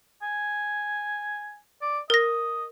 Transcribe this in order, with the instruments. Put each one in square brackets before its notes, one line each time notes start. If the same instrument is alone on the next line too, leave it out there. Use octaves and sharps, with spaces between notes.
[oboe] G#5
D5
[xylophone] A#4 A#6 [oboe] D#5